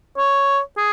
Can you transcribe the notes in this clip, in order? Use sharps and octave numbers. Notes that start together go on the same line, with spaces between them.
C#5
G#4